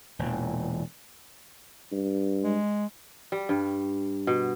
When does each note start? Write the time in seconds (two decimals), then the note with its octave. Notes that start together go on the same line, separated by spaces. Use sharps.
0.19 E1 A#2 E3
1.92 G2
2.43 G#3
3.32 G3
3.49 G2
4.27 B2